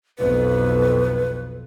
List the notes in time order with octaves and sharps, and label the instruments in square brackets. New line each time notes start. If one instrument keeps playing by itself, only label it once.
[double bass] B1 F2 [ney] B4